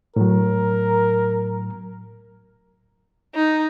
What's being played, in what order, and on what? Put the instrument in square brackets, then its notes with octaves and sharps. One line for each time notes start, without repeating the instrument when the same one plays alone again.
[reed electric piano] A2 F#3 [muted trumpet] A#4
[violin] D#4